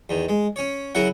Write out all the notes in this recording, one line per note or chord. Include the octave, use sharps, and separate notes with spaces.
E2 D#3
G#3
C#4 C#5
C#3 F#3 E4 A#4 F#5